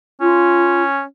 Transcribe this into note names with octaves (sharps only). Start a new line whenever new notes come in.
C#4 F4